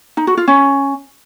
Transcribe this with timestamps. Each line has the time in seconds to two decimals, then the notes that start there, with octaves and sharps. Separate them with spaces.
0.17 D#4
0.27 F#4
0.37 F4
0.48 C#4